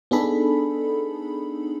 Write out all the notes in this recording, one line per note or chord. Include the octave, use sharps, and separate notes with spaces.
B3 D4 D#4 G#4 A4 B5